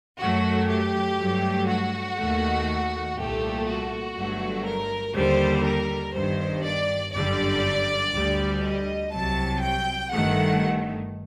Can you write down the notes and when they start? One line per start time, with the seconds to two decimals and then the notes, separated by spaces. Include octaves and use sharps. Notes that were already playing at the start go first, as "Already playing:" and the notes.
0.19 F#2 F#3 A3 F#4
0.69 G4
1.18 G2 F#3 A3
1.68 F#4
2.17 D#2 D#3 A3
3.17 C2 A#2 A3 G4
3.67 F#4
4.16 G1 G2 F#3 A3
4.66 A#4
5.15 D#2 D3 G3 C5
5.65 A#4
6.15 G1 G2 D#3 C5
6.64 D5
7.14 G1 F#2 D3 G3 D5
8.13 D2 D3 G3
8.63 D#5
9.12 C2 C3 F#3 A5
9.62 G5
10.11 G1 G2 D#3 A3 F#5